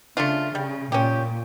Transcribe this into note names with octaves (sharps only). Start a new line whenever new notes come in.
C#3 A3 D4 F4
C#3 G3
A#2 C#4 G4